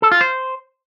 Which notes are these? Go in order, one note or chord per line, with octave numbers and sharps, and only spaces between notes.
A4
F4
C5